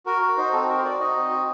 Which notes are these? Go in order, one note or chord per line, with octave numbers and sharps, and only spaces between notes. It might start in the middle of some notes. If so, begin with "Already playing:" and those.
F#4 A#4
F#4
D#4 C5
C4 A4
F#4 A#4
C5
F#4 D5
D#4 D#5
C4
F#4